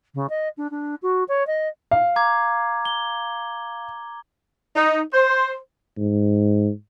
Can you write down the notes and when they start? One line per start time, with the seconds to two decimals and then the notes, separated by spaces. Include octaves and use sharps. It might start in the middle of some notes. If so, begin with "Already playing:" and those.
0.15 C#3
0.30 D#5
0.57 D4
0.71 D4
1.02 F#4
1.28 C#5
1.47 D#5
1.91 F5
2.16 A#5 D6 G#6
2.85 G7
4.75 D#4
5.12 C5
5.98 G#2